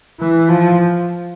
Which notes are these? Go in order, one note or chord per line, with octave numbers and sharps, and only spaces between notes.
E3
F3